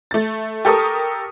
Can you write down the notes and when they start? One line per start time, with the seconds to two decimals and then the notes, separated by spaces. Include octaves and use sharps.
0.11 A3 A6
0.65 G4 A4 A#4 C#6 D#6